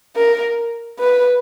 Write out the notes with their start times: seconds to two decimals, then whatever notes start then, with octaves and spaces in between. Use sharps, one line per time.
0.16 A#4
0.99 B4